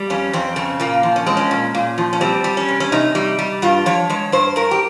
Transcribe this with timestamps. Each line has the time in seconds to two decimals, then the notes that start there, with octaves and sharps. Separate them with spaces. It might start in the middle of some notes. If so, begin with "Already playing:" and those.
Already playing: G3
0.10 F2 C#4
0.33 F2 C4
0.56 C#3 C4
0.80 A#2 A#3
1.03 F3
1.16 C#4
1.26 G#3 C4
1.37 C#4
1.51 A#2
1.74 A#2
1.98 F3
2.13 C#4
2.21 G3 C4
2.44 G3
2.57 C#4
2.68 C3
2.80 C#4
2.92 C3 D#4
3.15 G3
3.39 G3
3.62 G2 F4
3.86 F3 C#5
4.09 G#3 C#5
4.32 G2 C5
4.56 G2 A#4
4.71 G4